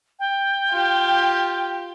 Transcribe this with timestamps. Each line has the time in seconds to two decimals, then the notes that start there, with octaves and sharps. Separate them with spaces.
0.19 G5
0.70 F4 G4